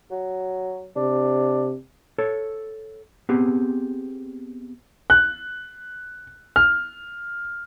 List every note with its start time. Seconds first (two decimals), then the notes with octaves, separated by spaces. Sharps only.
0.11 F#3
0.96 C3 D4
2.18 A4 C#5
3.29 B3 C4 G4 G#4
5.10 F#6
6.56 F6